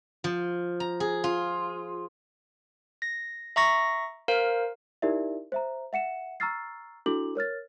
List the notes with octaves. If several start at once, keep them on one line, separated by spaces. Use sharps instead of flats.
F3
A#5
G#4
F4
A#6
E5 A#5 C#6 A#6
A#4 C5 F5
D#4 E4 G4 A#4 D5 E5
C5 E5 A#5
E5 F#5 C#7 E7
A#5 C#6 E6 F6 A6 C7
D4 E4 F#4 A4 D6 F#7
A#4 C#5 F6 A6